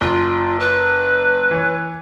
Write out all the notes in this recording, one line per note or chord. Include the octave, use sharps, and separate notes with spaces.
F#1 F4
B4
E3 C#5